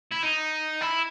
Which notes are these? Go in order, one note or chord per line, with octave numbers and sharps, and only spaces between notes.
E4
D#4
E4